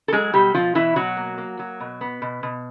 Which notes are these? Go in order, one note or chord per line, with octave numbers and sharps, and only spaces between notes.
A4
F#3 G#3 G#4
B2 G3 G4
B2 F3 F4
B2 E3 E4
B2 F#3 F#4
A#3
A#3
F#3
B2
B3
B2
B2